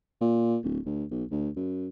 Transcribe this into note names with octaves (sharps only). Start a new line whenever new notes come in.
A#2
D1
D2
B1
D2
F#2